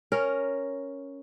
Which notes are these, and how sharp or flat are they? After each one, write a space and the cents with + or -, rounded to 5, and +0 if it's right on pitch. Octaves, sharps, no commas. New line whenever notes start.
C#4 +0 A#4 +0